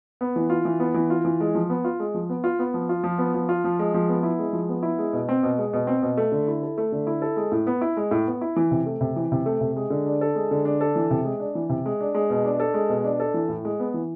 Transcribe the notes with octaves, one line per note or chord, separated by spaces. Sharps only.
B3
E3
F4
E3
B3
E3
F4
E3
G#3
F3
B3
F4
G#3
F3
B3
F4
B3
F3
F4
F3
B3
F3
F4
F3
G#3
F3
B3
E4
G#3
F3
B3
E4
G#3
B2
C4
B2
G#3
B2
C4
B2
A3
D3
E4
A4
A3
D3
E4
A4
G#3
A2
B3
E4
G#3
A2
B3
E4
E3
C3
A3
C3
E3
C3
A3
C3
G#3
D3
D4
A4
G#3
D3
D4
A4
E3
C3
G#3
D4
E3
C3
G#3
D4
G#3
B2
D4
A4
G#3
B2
D4
A4
E3
A2
G#3
B3
E3